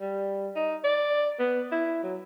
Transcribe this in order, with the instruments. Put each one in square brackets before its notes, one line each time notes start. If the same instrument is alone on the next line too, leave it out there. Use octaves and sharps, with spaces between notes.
[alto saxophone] G3
D#4
D5
B3
E4
F#3